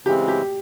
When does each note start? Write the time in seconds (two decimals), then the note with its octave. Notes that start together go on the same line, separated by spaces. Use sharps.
0.05 C#3 E3 G#3 C4 G4
0.28 G4